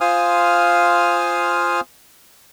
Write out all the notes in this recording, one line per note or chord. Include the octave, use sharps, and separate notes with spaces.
F4 C5 F5 G#5 D#6 F6